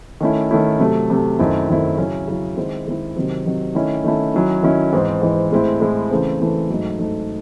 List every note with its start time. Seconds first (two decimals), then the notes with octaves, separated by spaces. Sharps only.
0.20 D#3 A3 C#4 E4
0.51 D#3 A3 C#4 E4
0.80 C3 F#3 A3
1.10 C3 F#3 A3
1.39 F#2 D#3 A3 C4 E4
1.69 F#2 D#3 A3 C4 E4
1.97 C#3 F#3 C#4 E4
2.27 C#3 F#3 C#4 E4
2.57 D#3 G#3 C4 E4
2.87 D#3 G#3 C4 E4
3.16 C3 D#3 F#3 C4
3.46 C3 D#3 F#3 C4
3.75 D#3 A3 C#4 E4
4.04 D#3 A3 C#4 E4
4.34 D#3 F#3 C#4 E4
4.63 D#3 F#3 C#4 E4
4.93 G#2 E3 C4
5.22 G#2 E3 C4
5.52 A2 G#3 C4 E4
5.81 A2 G#3 C4 E4
6.10 C#3 E3 A3 C4
6.40 C#3 E3 A3 C4
6.70 G#2 F#3 A3 D#4
6.99 G#2 F#3 A3 D#4